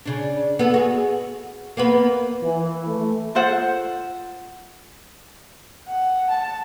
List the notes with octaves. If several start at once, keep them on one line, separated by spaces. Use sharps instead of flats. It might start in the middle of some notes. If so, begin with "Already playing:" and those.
C#3 D4
B3 A4
F#4 G#4
A#3 B3 B4
E3
A3
F4 A4 C5 F#5
F#5
A5